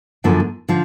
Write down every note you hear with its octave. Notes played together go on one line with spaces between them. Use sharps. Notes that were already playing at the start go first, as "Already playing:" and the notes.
F#2 D3 F3 A#3
D3 F3